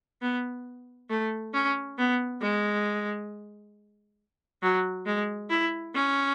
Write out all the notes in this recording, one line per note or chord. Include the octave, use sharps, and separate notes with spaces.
B3
A3
C#4
B3
G#3
F#3
G#3
E4
C#4